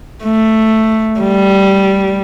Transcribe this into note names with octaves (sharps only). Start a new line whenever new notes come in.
A3
G3